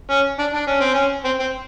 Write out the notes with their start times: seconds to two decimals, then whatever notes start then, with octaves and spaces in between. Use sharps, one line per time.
0.10 C#4
0.39 D4
0.54 D4
0.67 C#4
0.81 C4
0.94 C#4
1.25 C4
1.40 C4